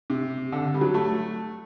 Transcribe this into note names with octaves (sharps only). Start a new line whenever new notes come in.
C3
D3
G3
F#3
A3